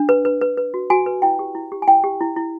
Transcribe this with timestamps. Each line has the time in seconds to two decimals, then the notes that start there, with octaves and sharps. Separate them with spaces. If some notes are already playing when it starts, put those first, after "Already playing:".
Already playing: D4
0.09 B4
0.25 B4
0.41 B4
0.57 B4
0.74 F#4
0.90 F#4 G#5
1.06 B4
1.22 E4 G5
1.39 G4
1.55 E4
1.72 G4
1.82 G#5
1.88 E4 G5
2.04 G4
2.21 E4
2.37 E4